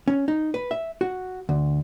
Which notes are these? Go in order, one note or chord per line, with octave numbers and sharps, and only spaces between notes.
C#4
D#4
B4
E5
F#4
D2